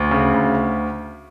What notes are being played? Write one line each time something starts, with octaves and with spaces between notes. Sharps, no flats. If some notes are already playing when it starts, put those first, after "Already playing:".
Already playing: D2
C#3
D2